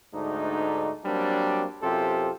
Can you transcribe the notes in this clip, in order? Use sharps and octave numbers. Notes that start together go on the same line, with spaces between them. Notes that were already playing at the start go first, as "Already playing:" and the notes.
D2 G#2 A3 D4 D#4
F#3 G3 A#3 C4 D4
F#2 C3 F4 G4 A4 C5